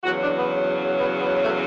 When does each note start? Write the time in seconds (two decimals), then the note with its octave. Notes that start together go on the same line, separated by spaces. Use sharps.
0.03 E2 C#3 F#3 F#4
0.21 D4
0.38 B3
0.97 B3
1.19 B3
1.43 A3